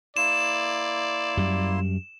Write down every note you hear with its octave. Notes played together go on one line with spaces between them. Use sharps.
A#3 E4 D5 C6 E7
F#2 G3